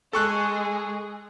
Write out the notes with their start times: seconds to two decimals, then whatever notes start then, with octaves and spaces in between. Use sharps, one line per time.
0.13 G#3 G#4 A4 C#6 F#6